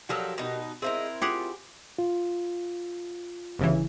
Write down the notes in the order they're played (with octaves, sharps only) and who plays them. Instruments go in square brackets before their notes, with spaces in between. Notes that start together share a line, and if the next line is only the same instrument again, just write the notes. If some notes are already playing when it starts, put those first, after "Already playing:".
[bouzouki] F3 F#3 A4 [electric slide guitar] F#4 G4 A#4
[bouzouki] B2 D#4
[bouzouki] C4 E4 A#4 [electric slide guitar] G#4 C5 D#5
[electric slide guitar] F4 [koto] G4 G#4 F#5
[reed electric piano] F4
[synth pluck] G1 C#3 E3